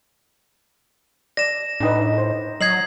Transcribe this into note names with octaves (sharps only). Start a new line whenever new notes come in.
D5 A#6 E7
A2 D4 D#4 B4
C5
F#3 D#5 G#6 C7 F#7